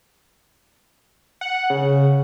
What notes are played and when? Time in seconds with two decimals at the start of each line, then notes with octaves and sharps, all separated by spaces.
1.41 F#5
1.70 C#3